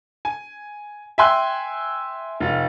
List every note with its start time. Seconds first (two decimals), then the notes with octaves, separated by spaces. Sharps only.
0.25 G#5
1.18 E5 G5 G#5 C6 F#6
2.40 F1 F4